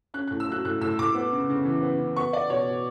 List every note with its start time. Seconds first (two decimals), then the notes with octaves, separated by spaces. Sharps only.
0.14 C#4 F#6
0.27 A2 F#6
0.40 E6
0.48 F#3 F#6
0.65 A2 F#6
0.81 A2 E6
0.99 A2 D6
1.15 B3
1.32 C#3
1.49 C#3
1.65 E3
1.82 B3
1.99 C#3
2.16 B3 C#6
2.32 B3 D5
2.50 B2 C#5
2.67 B2